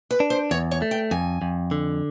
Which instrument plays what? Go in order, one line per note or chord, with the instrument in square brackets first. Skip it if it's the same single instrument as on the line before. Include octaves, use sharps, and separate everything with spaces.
[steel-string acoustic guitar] B4
[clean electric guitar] D4
[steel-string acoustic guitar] C5
[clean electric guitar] E2 [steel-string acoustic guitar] C#5
[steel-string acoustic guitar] C#5
[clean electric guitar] A3
[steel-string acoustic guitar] G5
[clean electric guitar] F2 [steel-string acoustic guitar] G#5
[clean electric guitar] F2
D3